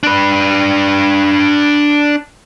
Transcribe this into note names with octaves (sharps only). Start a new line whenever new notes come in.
D4 B4